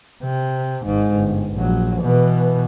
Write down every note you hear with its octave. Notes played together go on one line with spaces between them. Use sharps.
C3
G#1 G#2
G1
A#1 F#3
B2 E3